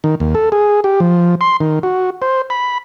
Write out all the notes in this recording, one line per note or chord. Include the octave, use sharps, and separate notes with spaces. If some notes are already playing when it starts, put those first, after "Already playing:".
D#3
D#2
A4
G#4
G4
F3
C6
D#3
F#4
C5
B5